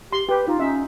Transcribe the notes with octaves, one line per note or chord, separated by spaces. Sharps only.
G4 C6
G4 B4
D#4 F4
C#4 D#4 E5